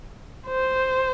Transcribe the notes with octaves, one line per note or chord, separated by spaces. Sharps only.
C5